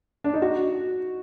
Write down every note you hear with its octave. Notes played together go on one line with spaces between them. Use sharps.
D4
D#4
F#4